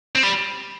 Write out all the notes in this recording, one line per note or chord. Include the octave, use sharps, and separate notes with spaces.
C4
G3